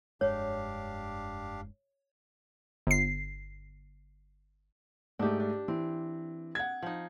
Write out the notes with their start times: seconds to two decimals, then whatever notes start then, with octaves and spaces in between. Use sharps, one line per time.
0.21 F1 G2 G#3 D4 G4 C#5 F5
2.87 G1 C7
5.19 G#2 A3 D4 G4
5.40 D4
5.68 E3 C4
6.55 F#5 G#6
6.82 F3 D#4